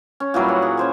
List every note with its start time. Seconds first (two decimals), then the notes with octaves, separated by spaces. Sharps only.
0.20 C#4
0.34 A#2 E3 F#3 G3
0.49 F#5
0.62 G#4
0.77 C#4 C5 G#5